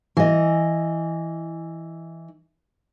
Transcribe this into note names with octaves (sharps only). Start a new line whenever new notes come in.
E3 D#5